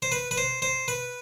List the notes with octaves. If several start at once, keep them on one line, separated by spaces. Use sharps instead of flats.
C5
B4
B4
C5
C5
B4